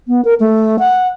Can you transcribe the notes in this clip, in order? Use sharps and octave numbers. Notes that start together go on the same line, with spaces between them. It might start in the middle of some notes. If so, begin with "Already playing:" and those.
B3
A#4
A3
F#5